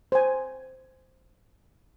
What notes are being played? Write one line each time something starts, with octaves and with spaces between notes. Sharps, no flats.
C5 G#5